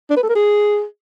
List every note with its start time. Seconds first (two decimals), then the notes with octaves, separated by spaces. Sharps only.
0.10 D4
0.17 B4
0.23 A4
0.29 A#4
0.36 G#4